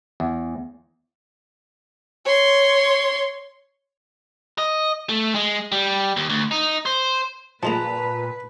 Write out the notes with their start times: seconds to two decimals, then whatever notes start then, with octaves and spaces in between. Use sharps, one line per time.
0.20 E2
2.25 C#5 C6
4.58 D#5
5.09 A3
5.35 G#3
5.72 G3
6.17 D#2
6.29 D2
6.51 D#4
6.86 C5
7.63 A#2 F3 G#3 A#3 B4 A5 A#5